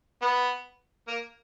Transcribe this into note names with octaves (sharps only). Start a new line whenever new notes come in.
B3
A#3